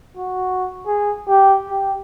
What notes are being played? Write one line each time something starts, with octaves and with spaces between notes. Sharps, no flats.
F#4
G#4
G4
G4